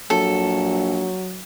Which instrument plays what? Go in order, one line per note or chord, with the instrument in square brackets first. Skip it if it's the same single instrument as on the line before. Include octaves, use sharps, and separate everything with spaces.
[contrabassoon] A#1 [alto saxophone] F#3 [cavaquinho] A4